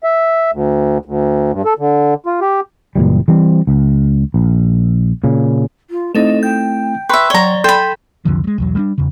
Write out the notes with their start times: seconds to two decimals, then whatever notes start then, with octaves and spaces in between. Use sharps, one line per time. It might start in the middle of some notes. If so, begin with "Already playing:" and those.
0.04 E5
0.52 D2
1.05 D2
1.52 G2
1.65 A4
1.79 D3
2.26 F4
2.41 G4
2.96 F#1 A#2 E3 G3
3.28 E3 G3 C4
3.67 C#2
4.34 A#1
5.24 A#2 C#3
5.90 F4
6.15 A3 C4 D#4 E4 A4 D#5 E7
6.43 G5 G6
7.09 B4 E5 G5 C6 C#6
7.30 F#3 C#5 D5 A#5 G7
7.64 A4 G5 B5 C6
8.25 C2 F2 D3 F3
8.44 F#3 G#3
8.58 B1 E2 F#3
8.75 G3 A3 D4
8.98 E2 C#3